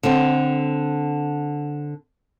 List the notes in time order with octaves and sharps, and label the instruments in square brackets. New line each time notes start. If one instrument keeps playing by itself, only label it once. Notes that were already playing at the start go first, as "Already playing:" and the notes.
[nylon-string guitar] D3 C4